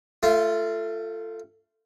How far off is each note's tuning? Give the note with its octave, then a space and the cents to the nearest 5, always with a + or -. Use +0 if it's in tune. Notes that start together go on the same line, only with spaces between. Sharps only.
A3 +15 F4 -10